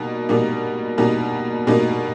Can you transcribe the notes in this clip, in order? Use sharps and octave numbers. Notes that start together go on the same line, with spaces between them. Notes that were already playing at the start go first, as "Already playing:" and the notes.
Already playing: B2 G3 A#3 D#4
B2 G3 A#3 D#4
B2 G3 A#3 D#4
B2 G3 A#3 D#4